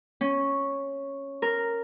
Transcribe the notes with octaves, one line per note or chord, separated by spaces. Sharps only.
C#4
A#4